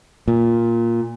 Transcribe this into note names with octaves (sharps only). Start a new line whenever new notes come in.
A#2